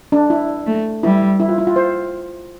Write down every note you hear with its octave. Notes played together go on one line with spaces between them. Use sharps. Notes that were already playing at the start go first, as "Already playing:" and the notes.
D4
E4
A3
G3 E4
E4
F4
E4
F4
C5